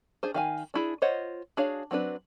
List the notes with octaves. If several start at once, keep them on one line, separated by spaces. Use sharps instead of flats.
D4 G#4 C5
D#3 F5 G#5
D4 E4 G#4
F4 C5 C#5 D#5 F#5
D4 F#4 G#4 C#5 F5
F#3 C4 D4 B4